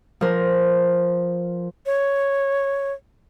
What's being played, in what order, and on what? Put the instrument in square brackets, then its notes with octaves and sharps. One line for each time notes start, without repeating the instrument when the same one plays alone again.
[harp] F3 A#4
[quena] C#5